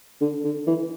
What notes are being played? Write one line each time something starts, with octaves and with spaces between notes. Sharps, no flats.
D3
D3
E3